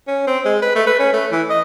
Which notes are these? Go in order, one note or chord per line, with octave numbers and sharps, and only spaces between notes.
C#4
C4
G#3
B4
A3
B4
C#4
A3
E3
D#5